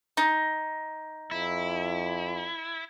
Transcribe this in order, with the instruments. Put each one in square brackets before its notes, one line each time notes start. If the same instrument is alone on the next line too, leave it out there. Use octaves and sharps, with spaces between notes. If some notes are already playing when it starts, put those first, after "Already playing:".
[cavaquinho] D#4
[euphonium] F2 [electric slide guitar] E4